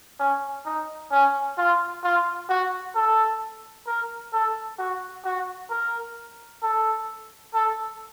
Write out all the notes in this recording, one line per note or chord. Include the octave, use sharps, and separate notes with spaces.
C#4
D#4
C#4
F4
F4
F#4
A4
A#4
A4
F#4
F#4
A#4
A4
A4